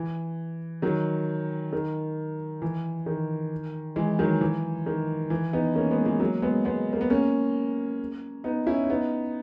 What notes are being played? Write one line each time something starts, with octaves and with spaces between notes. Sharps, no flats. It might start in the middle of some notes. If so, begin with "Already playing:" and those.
Already playing: E3
D#3 F#3
D#3
E3
D#3
E3 G#3
D#3 F#3
E3
D#3
E3
B3 D#4
A#3 C#4
G#3 B3
E3 G#3
F#3 A#3
G#3 B3
G#3 B3
A#3
B3
A#3 C#4
B3 D#4
C#4 E4
C#4
B3 D#4